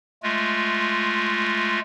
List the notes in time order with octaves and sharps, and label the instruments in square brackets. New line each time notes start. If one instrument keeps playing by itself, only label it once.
[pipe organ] G#3 A3 F4